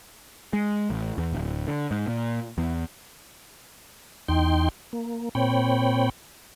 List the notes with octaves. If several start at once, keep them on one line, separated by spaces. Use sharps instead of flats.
G#3
A1
E2
D1
D3
G#2
A#2
E2
E2 D#4 G5 C6
A#3
A#2 C4 C#5 G5 B5